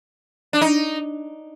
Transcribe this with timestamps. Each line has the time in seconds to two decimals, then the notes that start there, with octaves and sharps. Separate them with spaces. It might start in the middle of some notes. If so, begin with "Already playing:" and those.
0.53 D4
0.61 D#4